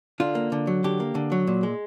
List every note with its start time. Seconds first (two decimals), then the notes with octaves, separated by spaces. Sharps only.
0.20 D3 F4
0.35 A#3
0.52 D3
0.67 F#3
0.84 D3 G4
1.00 A#3
1.15 D3
1.32 F#3
1.47 A#2
1.63 G#3